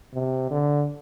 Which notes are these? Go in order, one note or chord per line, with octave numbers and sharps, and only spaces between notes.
C3
D3